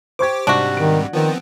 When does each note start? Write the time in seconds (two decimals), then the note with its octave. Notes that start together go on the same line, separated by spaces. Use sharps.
0.19 G4 C5 C#6 D6 G#6
0.47 G#2 C3 G3 D4 F#4
0.77 D#3 D7
1.13 D#3 F3 B3 C4